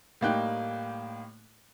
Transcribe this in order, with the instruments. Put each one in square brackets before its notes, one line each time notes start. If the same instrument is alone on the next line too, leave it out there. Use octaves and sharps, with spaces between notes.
[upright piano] A2 G3 A#3 D#4 G5 F#6